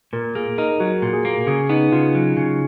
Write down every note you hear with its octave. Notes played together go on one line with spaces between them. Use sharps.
A#2 A#4
A#3 G#4
D#4 A#4
F#3 F#4
A#2
G#4
A#3
C#3 G#4
B3 D#4
C#3 F4
F#3
C#3